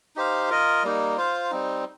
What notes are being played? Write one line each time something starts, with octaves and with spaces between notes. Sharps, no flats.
D#4 G4 C5 F5
F4 A#4 D#5
G3 A#3 D#4
F4 C5 F5
G3 C4 D#4